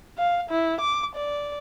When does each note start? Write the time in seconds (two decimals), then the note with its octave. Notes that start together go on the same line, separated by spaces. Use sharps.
0.18 F5
0.50 E4
0.81 D6
1.15 D5